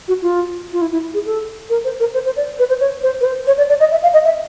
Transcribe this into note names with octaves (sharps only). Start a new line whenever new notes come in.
F#4
F4
F4
E4
E4
G#4
A4
A#4
C5
A#4
C5
C5
D5
B4
C5
C#5
C5
B4
C5
C#5
D5
D5
D#5
E5
F5
D#5
E5